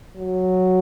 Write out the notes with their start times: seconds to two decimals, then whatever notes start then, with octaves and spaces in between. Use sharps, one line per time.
0.16 F#3